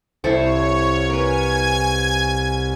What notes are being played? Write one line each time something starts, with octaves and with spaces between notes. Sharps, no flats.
C2 E4 A4 C5 C#5
A#4 B4 G#5 G#6